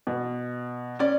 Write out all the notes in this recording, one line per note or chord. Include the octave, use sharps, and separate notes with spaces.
B2
C#4 D5